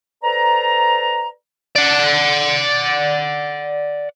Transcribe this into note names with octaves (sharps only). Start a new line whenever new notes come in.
A4 B4 C5 D5 A#5
D5 F#5